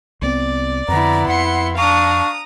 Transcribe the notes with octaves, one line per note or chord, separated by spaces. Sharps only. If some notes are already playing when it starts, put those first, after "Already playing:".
C2 B3 C4 D5
F2 D3 B3 E4 A#5
F2 F#5 C6 C#7
D4 F5 A#5 C#6 D#6